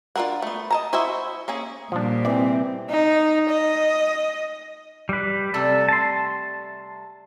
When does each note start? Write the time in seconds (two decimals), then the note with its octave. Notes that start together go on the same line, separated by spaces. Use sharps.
0.16 D4 F4 G#4 A#4 F#5
0.42 A3 B3
0.71 D#5 A5 A#5
0.93 E4 F#4 C5 D#5 E5
1.48 A#3 C#4 G#4
1.92 A#2 F3 G3 D4
2.25 C3 E3 C4 D5
2.90 D#4
3.49 D#5
5.09 G3 B4
5.54 C3 G3 A3 A4
5.89 A5 C6